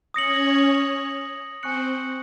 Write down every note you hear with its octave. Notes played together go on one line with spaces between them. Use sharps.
C#4 C#5 D#6 A#6 C#7 F#7
C4 C5 G#5 C#6 F#6 C#7 F#7